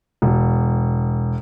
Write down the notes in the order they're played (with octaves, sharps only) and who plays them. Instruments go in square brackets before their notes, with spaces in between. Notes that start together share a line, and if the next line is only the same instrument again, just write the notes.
[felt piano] E1